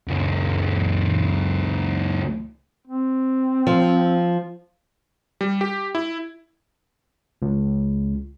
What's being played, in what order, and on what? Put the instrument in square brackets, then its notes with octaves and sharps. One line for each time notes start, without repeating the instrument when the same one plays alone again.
[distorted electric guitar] C#2 F#2
[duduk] C4
[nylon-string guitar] F3
[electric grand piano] G3
G4
E4
[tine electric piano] C#2